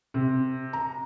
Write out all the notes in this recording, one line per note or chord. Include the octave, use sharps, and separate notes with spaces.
C3
A#5